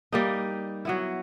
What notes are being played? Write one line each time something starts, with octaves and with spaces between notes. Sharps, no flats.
G3 A#3 D#4
F#3 B3 E4